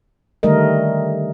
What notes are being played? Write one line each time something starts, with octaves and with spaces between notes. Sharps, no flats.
D3 D#3 G3 A3 A#4 D#5